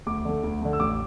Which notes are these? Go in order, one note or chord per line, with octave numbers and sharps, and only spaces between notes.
D2 D6
D3 A3
D2
D3 A3
E6
A1 D6